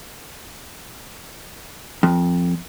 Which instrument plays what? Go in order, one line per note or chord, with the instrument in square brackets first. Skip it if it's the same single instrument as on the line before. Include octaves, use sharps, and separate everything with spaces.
[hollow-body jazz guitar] F2